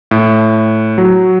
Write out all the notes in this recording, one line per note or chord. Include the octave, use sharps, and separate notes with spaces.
A2
F#3